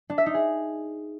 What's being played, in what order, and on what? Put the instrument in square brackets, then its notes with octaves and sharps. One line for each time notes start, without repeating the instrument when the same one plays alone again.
[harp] D4
E5
D#4
G#4